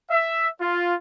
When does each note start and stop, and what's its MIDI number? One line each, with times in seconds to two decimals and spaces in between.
0.10 0.48 76
0.60 0.95 65